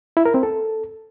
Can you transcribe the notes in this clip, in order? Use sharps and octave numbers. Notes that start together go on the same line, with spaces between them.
E4
A#4
C4
A4